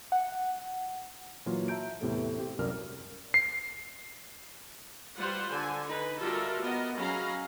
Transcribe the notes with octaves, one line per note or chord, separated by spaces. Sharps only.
F#5
A#2 E3 F#3 A#3 F4
E5 A5 A#5 G6 D7
E2 A2 C3 B3 A4
C4 G4
C2 F#2 A#4 D5 F6
C7
G3 F4 B4 C5 F#5
D3 G#5
D#4 B4
G3 F4 F#4 A4 A#4 E5
B3 A#4 D#5
F#3 C#4 G#4 F5 A#5 B5